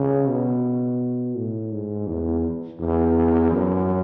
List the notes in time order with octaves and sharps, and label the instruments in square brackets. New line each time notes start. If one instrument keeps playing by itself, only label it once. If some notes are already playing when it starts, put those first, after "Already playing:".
Already playing: [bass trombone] C#3
B2
A2
G#2
E2
E2
F#2